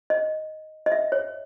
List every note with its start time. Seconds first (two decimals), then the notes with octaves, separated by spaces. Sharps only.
0.10 D#5
0.86 D#5
0.92 E5
1.12 C#5